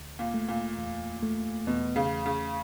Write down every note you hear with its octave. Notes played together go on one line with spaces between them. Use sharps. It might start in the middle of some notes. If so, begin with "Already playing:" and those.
Already playing: D2
A#2
A3
A#2
E2
A3
E2 B2
C#3
E2
C#3